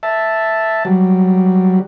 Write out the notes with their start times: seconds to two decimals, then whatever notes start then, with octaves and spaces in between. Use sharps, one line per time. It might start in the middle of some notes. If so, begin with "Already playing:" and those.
0.03 E5 A5
0.85 F#3 G3